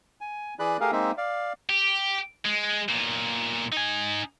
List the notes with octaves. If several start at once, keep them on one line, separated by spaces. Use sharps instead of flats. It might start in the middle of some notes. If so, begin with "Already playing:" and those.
G#5
E3 G#4 D5 B5 F#6
A3 G4 G#4 A#4 F5
G#3 A#3 C4 D#4 E5
D5 F5
G4
G#3
B1 A#2
D#4 G#5